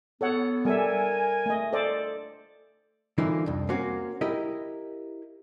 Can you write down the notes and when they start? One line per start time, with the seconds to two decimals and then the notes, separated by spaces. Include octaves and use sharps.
0.21 B3 A4 C#5 F#5
0.65 G3 A4 A#4 E5 G#5
1.46 A3 D#5
1.73 A4 C5 D5
3.18 D3 E3 F3 A#3 D#4 E4
3.46 C2 F2
3.69 A#3 C4 C#4 F#4
4.21 E4 G4 A#4 D#5